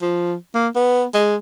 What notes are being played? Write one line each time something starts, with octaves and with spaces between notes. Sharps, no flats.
F3
A#3
B3
G#3